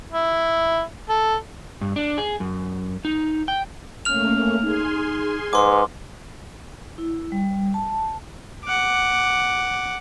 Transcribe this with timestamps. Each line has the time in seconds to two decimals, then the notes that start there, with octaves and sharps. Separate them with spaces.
0.12 E4
1.09 A4
1.81 G2
1.96 D4
2.18 G#4
2.40 F#2
3.05 D#4
3.48 G5
4.05 A3 A#3 C#4 F6 F7
4.62 D#4 G#4 G#5 C6
5.53 G#2 B4 C6 D6
6.98 E4
7.32 G3
7.74 A5
8.65 F#5 D6